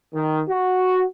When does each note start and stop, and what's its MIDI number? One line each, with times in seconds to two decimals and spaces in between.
0.14 0.42 51
0.50 1.04 66